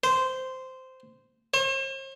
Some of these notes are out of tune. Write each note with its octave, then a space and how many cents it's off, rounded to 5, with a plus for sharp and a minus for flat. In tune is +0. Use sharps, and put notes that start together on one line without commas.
C5 -10
C5 +45